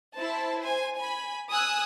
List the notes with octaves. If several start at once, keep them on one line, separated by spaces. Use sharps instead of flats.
E4 C5 A5
C5 G#5
G#5 B5
G#5 D#6 E6 F#6